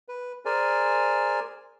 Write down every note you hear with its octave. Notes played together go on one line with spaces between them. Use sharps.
B4
G#4 A#4 C5 D5 G#5